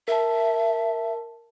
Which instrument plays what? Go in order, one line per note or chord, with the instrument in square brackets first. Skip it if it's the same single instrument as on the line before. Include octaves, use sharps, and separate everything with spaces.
[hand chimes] A#4 A5 [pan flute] E5